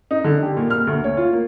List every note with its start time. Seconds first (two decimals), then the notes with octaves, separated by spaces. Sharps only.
0.11 D#4
0.24 D3
0.42 G4
0.57 A#2
0.70 F6
0.87 D2
1.04 C#5
1.17 F4
1.33 A#3